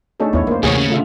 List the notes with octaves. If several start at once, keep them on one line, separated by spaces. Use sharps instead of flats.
A3 D4 D#4 G#4 A4 C#5
E2 B3 E4 C#5
F2 A#3 C5
A1 D#2 C3 E3 G#4 C#5
C#3
A3 F4 E5